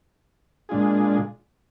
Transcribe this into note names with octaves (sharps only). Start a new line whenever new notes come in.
A#2 G#3 D4 F4 G#4